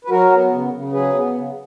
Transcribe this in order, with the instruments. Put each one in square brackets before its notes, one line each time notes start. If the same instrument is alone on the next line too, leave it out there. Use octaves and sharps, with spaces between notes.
[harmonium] B4
F#3 F#4 A#4
B3
C#3
C#3
F#3 G#4 B4
B3
C#3